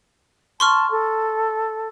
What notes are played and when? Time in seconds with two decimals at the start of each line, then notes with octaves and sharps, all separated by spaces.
0.60 A5 C6 C#6 F6
0.90 A4